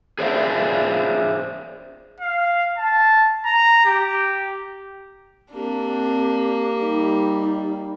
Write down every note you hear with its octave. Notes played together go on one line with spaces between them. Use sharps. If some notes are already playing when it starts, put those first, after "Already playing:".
G#4 C5 D5 E5 F5
F5
A5
A#5
G4
A#3 C4 D4 G4
G3 D#4